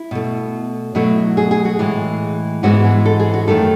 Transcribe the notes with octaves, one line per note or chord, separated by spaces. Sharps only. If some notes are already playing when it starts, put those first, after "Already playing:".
Already playing: E4
B2 A3
B2 F#3 A3 E4
G#4
G#4
F#4
A2 E3 G#3
G#2 E3 G#3 B3 F#4
G#4
A4
G#4
F#4
F#2 D#3 A3 A4